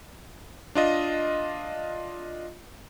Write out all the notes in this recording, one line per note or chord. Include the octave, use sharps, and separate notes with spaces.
D4 F4 D#5